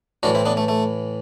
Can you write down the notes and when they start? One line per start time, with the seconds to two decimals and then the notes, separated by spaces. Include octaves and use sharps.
0.23 A2 E3 D4 F#4
0.35 C4 E4
0.46 B3 D4
0.57 A3
0.68 A3